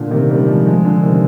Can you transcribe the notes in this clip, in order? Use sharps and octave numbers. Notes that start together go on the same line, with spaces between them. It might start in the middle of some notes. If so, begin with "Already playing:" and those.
Already playing: A#2 D3
C3 D#3
D#3 G3
F3 G#3
F3 G#3
D3 F3
C3 D#3